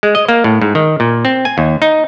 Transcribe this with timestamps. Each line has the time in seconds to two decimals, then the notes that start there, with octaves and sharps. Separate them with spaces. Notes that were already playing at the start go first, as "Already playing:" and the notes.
0.03 G#3
0.15 D#5
0.29 A#3
0.44 A2
0.62 G#2
0.75 D#3
1.00 A#2
1.25 C4
1.45 G#5
1.58 D#2
1.82 D#4